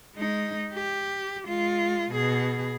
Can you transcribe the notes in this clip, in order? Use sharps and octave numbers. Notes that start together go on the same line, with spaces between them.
G#3 D#4
G4
G#3 F4
B2 G#4